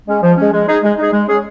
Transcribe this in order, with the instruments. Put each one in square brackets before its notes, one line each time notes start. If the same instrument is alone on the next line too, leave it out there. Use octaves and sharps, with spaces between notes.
[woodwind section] G#3 C#4
F3
G#3 C#4
G#3
D#4 G#4
G#3
D#4 G#4
G#3
C#4 G#4